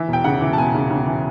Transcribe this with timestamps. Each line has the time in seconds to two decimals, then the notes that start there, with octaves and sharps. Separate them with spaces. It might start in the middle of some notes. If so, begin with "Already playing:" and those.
Already playing: E3 E5
0.08 E1
0.13 G5
0.24 C#3 F#5
0.41 E3
0.53 A5
0.58 E1 G#5
0.74 C#3
0.90 C#3
1.06 E3